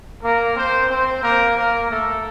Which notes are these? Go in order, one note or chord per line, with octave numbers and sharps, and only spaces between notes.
A#3 A#4
C4 C5
C4 C5
A#3 A#4
A#3 A#4
A3 A4